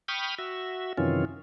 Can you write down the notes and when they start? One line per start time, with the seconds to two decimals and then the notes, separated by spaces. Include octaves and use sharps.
0.08 G5 B5 C#6 D#6 F6
0.39 F#4 E5
0.98 F#2 C3 D#3 E3 C#4 F4